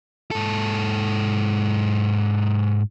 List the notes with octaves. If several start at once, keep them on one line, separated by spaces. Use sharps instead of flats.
G#2 A4